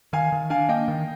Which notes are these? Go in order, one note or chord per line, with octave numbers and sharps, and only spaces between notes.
D#3 F5 G#5
D#3
D4 F5 G#5
A#3 D#5 G5
D#3